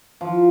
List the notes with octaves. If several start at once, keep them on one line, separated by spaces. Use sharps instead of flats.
F3